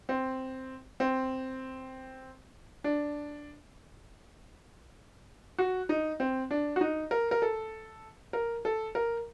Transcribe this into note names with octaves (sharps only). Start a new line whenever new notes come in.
C4
C4
D4
F#4
D#4
C4
D4
F#4
D#4
A#4
A#4
A4
A#4
A4
A#4